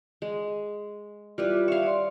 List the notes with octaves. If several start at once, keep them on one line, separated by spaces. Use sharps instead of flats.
G#3
G3 E4 F4 B4
C#5 E5 F5
D5 C6